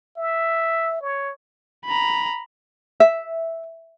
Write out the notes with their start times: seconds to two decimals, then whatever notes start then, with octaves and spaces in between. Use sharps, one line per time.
0.17 E5
1.01 C#5
1.85 A#5 B5
3.00 E5